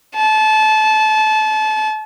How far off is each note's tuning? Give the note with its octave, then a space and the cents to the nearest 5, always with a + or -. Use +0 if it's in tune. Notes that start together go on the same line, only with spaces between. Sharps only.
A5 -25